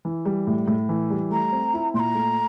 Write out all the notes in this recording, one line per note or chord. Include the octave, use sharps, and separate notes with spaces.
E3
G3
A2
A2
E3
G3
A3 A#5
C4
E4
A#2 A#5 C6
A3